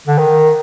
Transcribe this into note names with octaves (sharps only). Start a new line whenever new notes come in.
D3
D#3